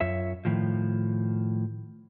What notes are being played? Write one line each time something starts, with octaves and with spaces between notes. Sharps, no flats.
F#2 F4 C#5 E5
A2 D#3 F3